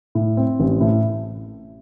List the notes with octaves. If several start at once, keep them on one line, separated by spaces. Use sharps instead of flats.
A2
C4
A1
A2